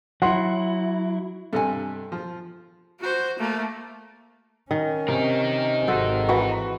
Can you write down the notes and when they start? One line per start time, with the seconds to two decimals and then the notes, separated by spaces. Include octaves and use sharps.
0.22 F#3 E4 F#5 C6
1.53 G2 C3 A4 D#5 G#5
2.12 F3
3.00 F#4 C5
3.39 A3 A#3
4.71 D#3 C#4
5.08 C3 D#4 A#4
5.87 G#1 F#4 A4 C5
6.29 E3 F#4 B4 C#6